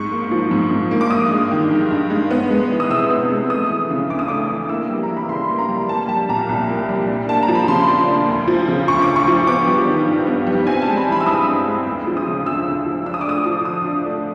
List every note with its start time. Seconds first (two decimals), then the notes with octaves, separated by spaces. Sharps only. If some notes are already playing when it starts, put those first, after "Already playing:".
Already playing: G#2 C#6
0.11 A#3
0.31 F3
0.51 G#2
0.71 G#2
0.91 A#3
1.01 D6
1.11 G2 D#6
1.31 G#3
1.51 D#3
1.71 G2
1.91 G2
2.10 G#3
2.31 B3
2.50 G#3
2.71 E3
2.80 D#6
2.90 C3 E6
3.10 B3
3.30 G#3
3.50 A3 D#6
3.69 E3
3.90 C#3
4.10 D2 D6
4.19 D#6
4.28 A3 D6
4.49 E3
4.69 A#3 E6
4.89 G3
5.03 A#5
5.09 E3
5.17 B5
5.29 C#3 C6
5.50 A#3
5.59 A#5
5.69 G3
5.89 A#3 A5
6.08 G3 A5
6.29 A#2 A#5
6.49 C2
6.69 A#3
6.89 G3
7.08 D4
7.29 A#3 A5
7.43 A#5
7.48 F3
7.55 B5
7.68 C#3 C6
7.88 D4
8.08 A#3
8.29 D2
8.48 F3
8.68 C#3
8.88 D2 C#6
9.02 D2 D6
9.16 C#6
9.28 F3
9.47 B3 D6
9.67 G3
9.87 D#3
10.07 G2
10.27 B3
10.47 G3
10.67 C4 G#5
10.82 A5
10.88 G#3
10.97 B5
11.07 E3
11.12 B5
11.21 E6
11.26 G2 D#6
11.46 C4
11.66 G#3
11.87 D2
12.07 F3
12.17 D#6
12.27 C#3
12.46 D2 E6
12.66 D2
12.86 F3
13.06 D4 E6
13.14 D#6
13.21 D6
13.26 A3 D#6
13.46 F3
13.65 D3 D#6
13.86 D4
14.06 A3